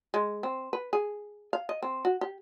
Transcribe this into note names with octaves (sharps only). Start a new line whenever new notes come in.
G#3
C4
B4
G#4
F5
D#5
C4
F#4
G4